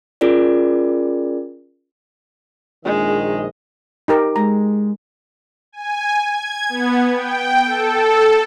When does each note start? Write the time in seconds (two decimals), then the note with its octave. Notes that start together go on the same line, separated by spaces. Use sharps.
0.21 C#4 F4 G#4 A#4 D5
2.85 A#1 D#3 G#3 D#5
4.08 D#4 G4 A#4
4.36 G#3 A#5
5.72 G#5
6.24 G#6
6.69 B3
7.14 G5
7.64 A4